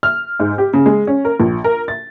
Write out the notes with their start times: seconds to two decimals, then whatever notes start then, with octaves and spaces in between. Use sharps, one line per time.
0.03 F6
0.40 G#2
0.58 G4
0.73 C#3
0.86 G#3
1.07 C#4
1.25 A#4
1.40 A#1
1.64 A#4
1.88 A6